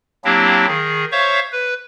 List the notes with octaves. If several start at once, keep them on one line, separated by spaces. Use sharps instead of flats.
F#3 A#3 C4 D4 E4 G4
D#3 G#4
C5 C#5 E5 F5 C#6
B4